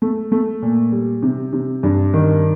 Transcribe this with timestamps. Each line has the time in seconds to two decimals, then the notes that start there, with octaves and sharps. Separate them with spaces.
0.02 A3
0.32 A3
0.62 A#2
0.92 G3
1.22 C3
1.53 C3
1.83 G2
2.14 D#3